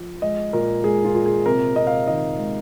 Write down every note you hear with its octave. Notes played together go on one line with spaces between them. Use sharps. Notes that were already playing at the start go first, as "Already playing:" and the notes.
Already playing: F3
G#3 D#5
A#2 A#4
G#3 G#4
F4
A#2
G#4
C3 A#4
C3 D#5
F5
D#3 D#5
G#3